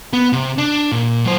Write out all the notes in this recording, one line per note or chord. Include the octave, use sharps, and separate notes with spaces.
B3
C3
D4
A#2
F#3 C5